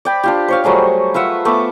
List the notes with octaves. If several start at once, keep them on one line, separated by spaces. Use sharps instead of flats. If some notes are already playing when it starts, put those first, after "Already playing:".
D5 G5 B5
D4 F4 G4
C5 C#5 F5
F#3 G3 A3 G#4
F4 B4 E5 F#5
A3 B3 B4 D6